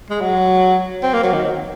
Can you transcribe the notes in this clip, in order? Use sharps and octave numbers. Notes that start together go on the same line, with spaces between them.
G#3
F#3
C4
A#3
F#3
D#3